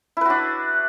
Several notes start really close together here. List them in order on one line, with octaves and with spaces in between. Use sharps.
E4 B4 F#4 D4